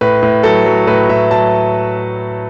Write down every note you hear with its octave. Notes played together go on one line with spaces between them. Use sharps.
A2 B4
A2
F#3 A4
F#3
A2 B4
A2 E5
F#3 A5